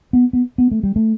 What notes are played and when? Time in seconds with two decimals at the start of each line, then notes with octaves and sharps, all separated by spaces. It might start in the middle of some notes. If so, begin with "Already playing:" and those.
0.13 B3
0.33 B3
0.58 B3
0.71 A3
0.83 G3
0.96 A3